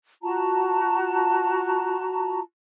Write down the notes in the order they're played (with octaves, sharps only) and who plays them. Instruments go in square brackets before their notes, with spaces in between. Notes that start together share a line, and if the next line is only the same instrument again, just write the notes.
[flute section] F4 F#4 A5 A#5